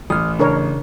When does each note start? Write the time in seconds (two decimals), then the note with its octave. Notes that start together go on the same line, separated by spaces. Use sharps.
0.10 A1 D#6 F6
0.39 C#3 D4 A#4 C#5